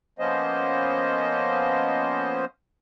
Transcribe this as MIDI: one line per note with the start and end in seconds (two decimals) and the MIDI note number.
0.19 2.45 53
0.19 2.45 58
0.19 2.45 59
0.19 2.45 61
0.19 2.45 72
0.19 2.45 75